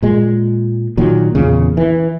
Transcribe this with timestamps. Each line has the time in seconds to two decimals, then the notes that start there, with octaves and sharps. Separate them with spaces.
0.03 A#2 G#3
0.97 A#2 D#3 F#3
1.35 E2 A#2 C#3
1.77 E3